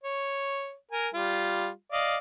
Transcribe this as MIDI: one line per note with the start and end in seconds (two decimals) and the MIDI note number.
0.04 0.74 73
0.92 1.08 70
0.92 1.08 80
1.14 1.68 55
1.14 1.68 65
1.92 2.16 74
1.92 2.16 75
1.92 2.16 77